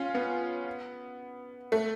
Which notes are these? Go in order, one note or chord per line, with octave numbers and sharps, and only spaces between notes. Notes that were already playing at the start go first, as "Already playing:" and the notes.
Already playing: C#4 F4
B3
A3